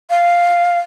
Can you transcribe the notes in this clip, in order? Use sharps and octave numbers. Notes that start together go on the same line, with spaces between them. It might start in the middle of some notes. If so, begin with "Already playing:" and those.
F5